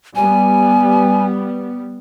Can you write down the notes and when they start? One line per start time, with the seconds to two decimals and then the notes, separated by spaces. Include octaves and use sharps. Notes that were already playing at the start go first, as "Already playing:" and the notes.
0.16 G3 B3 G#5